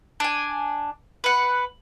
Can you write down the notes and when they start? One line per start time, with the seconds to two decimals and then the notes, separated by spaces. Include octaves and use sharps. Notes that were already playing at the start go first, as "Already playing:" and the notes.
0.20 D4 G#5
1.24 B4 F#5